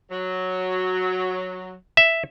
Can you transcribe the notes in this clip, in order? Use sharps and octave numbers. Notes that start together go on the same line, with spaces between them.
F#3
E5